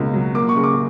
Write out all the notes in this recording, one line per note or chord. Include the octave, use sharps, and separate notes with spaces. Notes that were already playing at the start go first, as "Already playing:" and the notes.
Already playing: C#2 B2 A#3
F#3
A#3 D6
C#6
C#3
D6